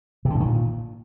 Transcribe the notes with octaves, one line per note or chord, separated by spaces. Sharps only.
C3
D3
A2
D#3
A#2